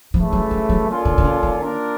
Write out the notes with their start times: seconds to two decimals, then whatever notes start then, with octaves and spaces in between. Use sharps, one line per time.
0.14 C#3 E3 F3 A3
0.33 F#3
0.51 F#3
0.69 F#3
0.88 A#3 C#4 F4 A4 D5
1.05 D3
1.18 D3
1.24 C#3
1.43 D#3
1.61 A#3 D4 F4 A#4